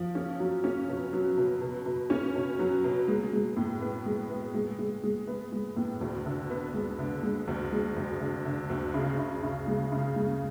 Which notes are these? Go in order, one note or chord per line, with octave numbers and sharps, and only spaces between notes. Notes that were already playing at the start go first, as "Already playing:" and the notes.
Already playing: F3
C#4
F#3
C#4
B2
F#3
B2
B2
B2
C#4
B2
F#3
B2
G#3
G#3
A2
B3
G#3
B3
G#3
G#3
G#3
B3
G#3
A2
D2
D3
B3
G#3
D3
G#3
D2
G#3
D2
D3
D3
D2
C#3
C#3
C#3
G#3
C#3
G#3